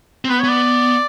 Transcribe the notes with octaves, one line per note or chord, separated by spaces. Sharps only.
C4
B3 B4
B3 C#5
D5